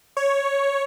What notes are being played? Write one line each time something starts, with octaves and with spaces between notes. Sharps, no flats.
C#5